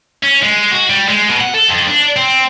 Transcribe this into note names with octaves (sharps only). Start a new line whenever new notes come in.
C#4
G#3
F#4
G3
G#3
B2
F#5
A4
F2
D4
C4